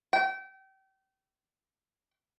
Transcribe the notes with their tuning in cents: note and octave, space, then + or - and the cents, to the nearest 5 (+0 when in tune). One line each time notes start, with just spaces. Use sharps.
G5 -30